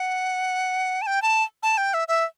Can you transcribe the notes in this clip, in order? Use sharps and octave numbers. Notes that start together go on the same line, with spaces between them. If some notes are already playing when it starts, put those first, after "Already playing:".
Already playing: F#5
A5
G5
A5
A5
G5
E5
E5